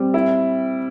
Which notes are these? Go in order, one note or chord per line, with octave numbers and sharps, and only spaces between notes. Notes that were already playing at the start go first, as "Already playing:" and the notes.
Already playing: G3 C4
E4